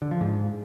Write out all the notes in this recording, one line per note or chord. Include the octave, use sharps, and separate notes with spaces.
D3
F3
G#2